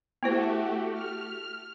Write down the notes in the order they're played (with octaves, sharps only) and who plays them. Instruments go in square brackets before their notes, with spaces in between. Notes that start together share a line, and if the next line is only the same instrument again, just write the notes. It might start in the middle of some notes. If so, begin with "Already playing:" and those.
[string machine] A3 F#4 G4 [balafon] B3 E4 C5
[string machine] F6